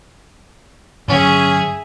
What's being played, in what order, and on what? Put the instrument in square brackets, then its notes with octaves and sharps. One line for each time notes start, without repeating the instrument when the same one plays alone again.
[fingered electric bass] G2 D3 F#3 [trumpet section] C#4 [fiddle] G#4 E5